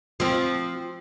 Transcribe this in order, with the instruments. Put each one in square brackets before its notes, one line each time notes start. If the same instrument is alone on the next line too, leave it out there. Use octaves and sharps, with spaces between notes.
[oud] F3 C4